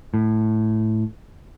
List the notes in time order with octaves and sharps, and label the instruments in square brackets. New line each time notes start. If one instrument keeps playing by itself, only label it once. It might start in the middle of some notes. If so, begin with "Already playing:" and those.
[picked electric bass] A2